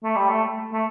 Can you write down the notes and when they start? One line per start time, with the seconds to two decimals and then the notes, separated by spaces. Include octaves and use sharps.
0.03 A3
0.16 G3
0.29 A3
0.73 A3